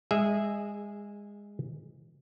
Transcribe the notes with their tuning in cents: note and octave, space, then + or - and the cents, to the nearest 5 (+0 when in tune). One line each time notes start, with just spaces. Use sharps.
G#3 -25 G#4 +0 E5 +0